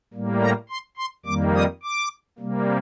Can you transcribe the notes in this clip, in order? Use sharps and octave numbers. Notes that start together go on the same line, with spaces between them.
A2 G3 A#3
A#5
C6
C6
F2 D#3 G3 A#3 D6
D#6
D6
C3 G3 A#3